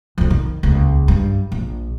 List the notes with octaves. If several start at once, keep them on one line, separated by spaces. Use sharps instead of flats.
F2 B2
D#3
D#1 C#2
G2
A#1